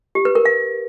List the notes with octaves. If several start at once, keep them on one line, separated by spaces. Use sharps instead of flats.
G4
B4
A#4
F5